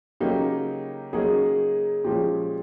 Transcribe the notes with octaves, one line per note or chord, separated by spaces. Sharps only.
C#3 F#3 A#3 D#4 G4
C#3 F#3 A#3 D#4 G#4
A#2 F3 G#3 C#4 G4